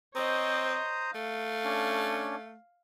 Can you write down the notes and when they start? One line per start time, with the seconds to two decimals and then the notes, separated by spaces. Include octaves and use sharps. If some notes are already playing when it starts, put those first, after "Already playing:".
0.15 C4 C5 C#5 D#5 A#5 D#6
1.15 A3 F5
1.65 C#4 D4